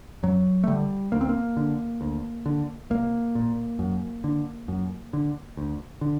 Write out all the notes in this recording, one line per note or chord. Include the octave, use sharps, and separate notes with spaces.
F#2 F#3
A3
D3 G3
D2 A#3
C4
A#3
D3
D2
D3
C2 A#3
A#2
F#2
D3
F#2
D3
D2
D3